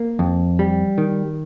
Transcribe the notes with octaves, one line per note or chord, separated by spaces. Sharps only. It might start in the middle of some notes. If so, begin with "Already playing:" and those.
Already playing: A#3
F2
G3
D#3